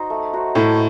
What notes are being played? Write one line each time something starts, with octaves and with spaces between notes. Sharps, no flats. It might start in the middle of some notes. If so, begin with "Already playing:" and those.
Already playing: D#4 F#4 C5
A3
D#4 F#4 C5
A2 A3